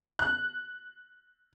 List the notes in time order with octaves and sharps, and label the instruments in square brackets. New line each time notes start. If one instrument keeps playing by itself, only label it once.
[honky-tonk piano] F#6